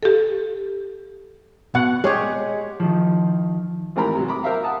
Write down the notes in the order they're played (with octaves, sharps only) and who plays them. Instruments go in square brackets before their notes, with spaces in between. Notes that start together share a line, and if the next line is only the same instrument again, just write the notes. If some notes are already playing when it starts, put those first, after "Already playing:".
[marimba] G4 A4
[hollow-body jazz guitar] B2 [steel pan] F#5
[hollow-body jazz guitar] G#3 G#4 [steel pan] G4 C#5
[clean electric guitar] D#3 F3
[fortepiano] A1 G#2 C4 A#4 A#5 B5
C3 F#3
A#5 B5 D6
A#4 C5 E5 F5 A#5
F#5 A5 D#6